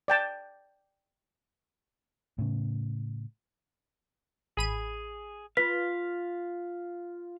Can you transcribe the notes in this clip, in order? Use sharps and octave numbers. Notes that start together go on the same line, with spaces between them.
D5 G5 A5
A2 C#3
A1 G#4 B5 D#7
F4 B4 F5 B6